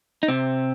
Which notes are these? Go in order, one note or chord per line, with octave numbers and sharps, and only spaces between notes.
D#4
C3 C4